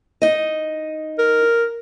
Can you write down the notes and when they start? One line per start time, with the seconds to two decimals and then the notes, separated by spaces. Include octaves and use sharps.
0.22 D#4 D#5
1.19 A#4